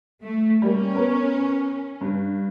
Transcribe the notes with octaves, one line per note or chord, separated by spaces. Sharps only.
A3
G3 A#3 C#4
B3 A#4 C#5
G2